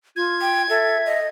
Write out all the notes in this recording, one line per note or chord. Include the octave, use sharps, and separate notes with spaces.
F4 G#6
G5
A4 E5
D#5